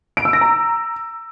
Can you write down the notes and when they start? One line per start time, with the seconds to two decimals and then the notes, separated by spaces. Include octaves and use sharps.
0.17 D7
0.25 E6
0.33 A#6
0.41 A#5